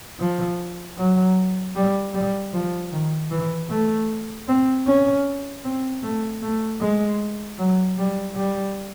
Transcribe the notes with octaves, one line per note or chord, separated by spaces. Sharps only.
F3
F#3
G3
G3
F3
D#3
E3
A3
C4
C#4
C4
A3
A3
G#3
F#3
G3
G3